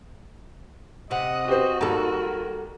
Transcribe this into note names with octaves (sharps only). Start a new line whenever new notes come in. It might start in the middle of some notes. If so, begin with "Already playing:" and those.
C3 D#5 F#5 D#6
F#4 G4 C5
D#2 G3 A4 A#4